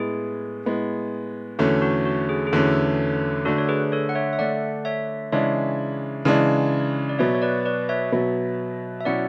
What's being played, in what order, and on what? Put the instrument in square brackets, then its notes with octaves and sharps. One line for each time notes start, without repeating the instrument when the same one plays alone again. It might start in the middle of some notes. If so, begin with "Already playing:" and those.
Already playing: [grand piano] A2 G#3 B3 [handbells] G#4
[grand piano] A2 G#3 B3
[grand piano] E2 D3 A3 C#4 [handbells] F#4
[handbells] F#4
F#4
G#4
G#4
[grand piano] E2 D3 A3 C#4 [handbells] F#4 A4
[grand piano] D3 A3 D4 [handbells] F#4 A4
[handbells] C#5
G#4 B4
A4 C#5
F#5
C#5 E5
E5
[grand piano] D3 A3 D4 [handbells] D5 F#5
[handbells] C#5 E5
[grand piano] C#3 E3 G#3 D4 [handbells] C#5 E5
[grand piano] C#3 E3 G#3 D4
[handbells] D5
[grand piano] B2 F#3 B3 [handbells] C#5 E5
[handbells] C#5
B4 D5
B4 D5
C#5 E5
[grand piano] B2 F#3 B3
[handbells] E5
[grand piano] B2 F#3 C#4 E4 [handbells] D5 F#5